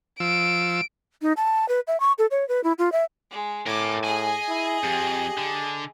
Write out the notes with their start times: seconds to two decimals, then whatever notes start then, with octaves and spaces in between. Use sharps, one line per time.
0.20 F3 E6 D7
1.22 D#4
1.37 A5
1.69 B4
1.87 E5
2.00 C#6
2.18 A4
2.31 C#5
2.49 B4
2.64 E4
2.79 F4
2.92 E5
3.30 G#3
3.67 A2 A#4 G#5 D6
4.04 G#4 D#5 G#5
4.48 E4
4.84 F2 G4
5.38 D3